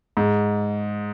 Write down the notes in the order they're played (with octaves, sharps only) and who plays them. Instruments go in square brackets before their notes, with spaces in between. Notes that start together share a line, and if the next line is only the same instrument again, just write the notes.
[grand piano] G#2